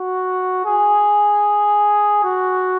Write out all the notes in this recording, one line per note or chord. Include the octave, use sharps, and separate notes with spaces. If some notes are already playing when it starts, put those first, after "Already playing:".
Already playing: F#4
G#4
F#4